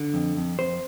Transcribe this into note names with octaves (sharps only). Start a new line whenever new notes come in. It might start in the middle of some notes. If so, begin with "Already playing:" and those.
Already playing: D3
F2
F2
F2 C5